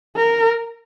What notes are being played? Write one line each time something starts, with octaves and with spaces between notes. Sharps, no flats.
A#4